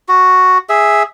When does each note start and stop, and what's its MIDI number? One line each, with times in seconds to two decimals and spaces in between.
0.08 0.58 66
0.69 1.03 68
0.69 1.03 76